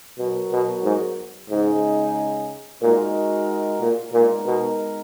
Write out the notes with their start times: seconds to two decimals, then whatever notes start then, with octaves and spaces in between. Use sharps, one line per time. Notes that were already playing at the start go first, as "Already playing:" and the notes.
0.18 B2 F#3 B3 F#4 A#4
0.52 B2
0.84 G#2
1.50 G#2 C#3 G#3 D#4 G#4
2.81 A#2 G#3 D#4 F#4 A#4
3.80 A#2
4.13 A#2 G#3 B3 D#4 A#4
4.46 B2